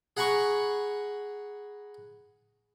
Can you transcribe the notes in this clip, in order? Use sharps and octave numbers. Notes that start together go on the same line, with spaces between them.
G#4 F#5 A#5 B5 C#6